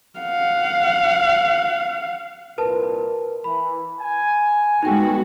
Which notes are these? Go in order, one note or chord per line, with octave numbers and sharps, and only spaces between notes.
F5 F#5
C2 A#2 A#4 B4 A5
E3 B5
G#5
A#2 G#3 B3 D#4 F#4 G#4 A4 G5